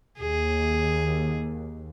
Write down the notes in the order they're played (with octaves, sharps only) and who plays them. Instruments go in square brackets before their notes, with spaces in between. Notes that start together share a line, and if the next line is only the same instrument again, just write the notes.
[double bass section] D#2 [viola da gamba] G#4